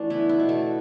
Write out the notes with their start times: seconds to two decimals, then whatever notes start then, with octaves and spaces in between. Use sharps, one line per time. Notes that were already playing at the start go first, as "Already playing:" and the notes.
Already playing: E3 A3 D4
0.10 B3 E4
0.29 E4
0.40 B2
0.49 A3 A4